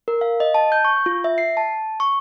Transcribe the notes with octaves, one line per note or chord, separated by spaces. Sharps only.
A#4
F5
D#5
A5
G6
C#6
F4
E5
C7
A5
C#6